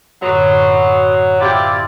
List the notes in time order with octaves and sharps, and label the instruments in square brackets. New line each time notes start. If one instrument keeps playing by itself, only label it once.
[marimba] F#2 A2 D3 [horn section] F#3 [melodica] B3 C6
[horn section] C3 G4 [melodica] E4 F4 D5